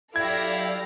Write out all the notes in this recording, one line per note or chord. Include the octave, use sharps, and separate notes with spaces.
F#3 E4 G4 A4 D5 F5 G#6 A#6